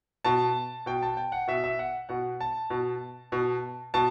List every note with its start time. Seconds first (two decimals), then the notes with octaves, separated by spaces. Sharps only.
0.25 B2 A5
0.86 B2 G5
1.02 A5
1.17 G5
1.32 F#5
1.48 B2 E5
1.64 E5
1.79 F#5
2.09 B2 F#5
2.40 A5
2.70 B2
3.32 B2
3.94 B2 A5